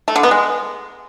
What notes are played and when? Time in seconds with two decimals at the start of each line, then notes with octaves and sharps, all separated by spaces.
0.08 A3
0.16 D3
0.23 B3
0.31 G#3